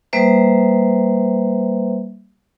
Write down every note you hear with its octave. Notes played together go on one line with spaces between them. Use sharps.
G3 A#3 B4 C5 E5